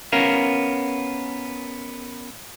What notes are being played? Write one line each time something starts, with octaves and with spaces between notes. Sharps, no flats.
B3 C#4 A#4 F5